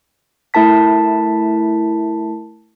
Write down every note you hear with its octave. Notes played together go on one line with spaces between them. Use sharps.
A3 E4 A#4 A5 B6